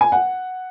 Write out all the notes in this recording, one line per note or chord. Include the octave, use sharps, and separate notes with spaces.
G#5
F#5